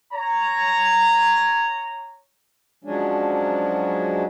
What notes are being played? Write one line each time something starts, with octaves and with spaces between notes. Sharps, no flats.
C#5 A#5
F3 F#3 G#3 C#4 D4